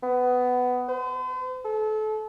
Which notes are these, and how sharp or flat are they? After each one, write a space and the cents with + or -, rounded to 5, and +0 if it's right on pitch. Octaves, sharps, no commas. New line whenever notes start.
B3 +15
C5 -45
A4 -30